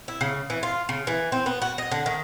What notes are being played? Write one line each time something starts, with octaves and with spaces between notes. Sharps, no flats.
E4
C#3
E3
F4
C#3
E3
C4
B3
F#4
D#5
D3
D#3